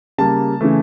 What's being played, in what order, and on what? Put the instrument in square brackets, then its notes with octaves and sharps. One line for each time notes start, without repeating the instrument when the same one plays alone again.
[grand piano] C#3 G3 A#3 A5
C#3 E3 A3